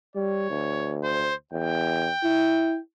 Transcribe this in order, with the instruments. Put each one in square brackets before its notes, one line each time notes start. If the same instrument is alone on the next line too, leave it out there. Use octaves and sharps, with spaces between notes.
[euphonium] G3 [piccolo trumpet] C#5
[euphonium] D2
[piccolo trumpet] C5
[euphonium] E2 [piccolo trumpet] G5
[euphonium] E4